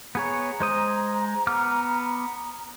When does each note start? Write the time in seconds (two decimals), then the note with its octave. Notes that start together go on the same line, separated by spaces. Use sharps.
0.15 B3 G#4 C#5 A#5
0.60 G#3 C5 D#6
1.47 B3 D6 F6